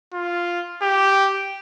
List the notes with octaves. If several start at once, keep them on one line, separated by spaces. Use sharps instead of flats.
F4
G4